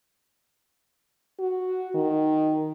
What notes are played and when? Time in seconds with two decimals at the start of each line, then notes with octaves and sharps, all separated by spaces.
1.40 F#4
1.95 D#3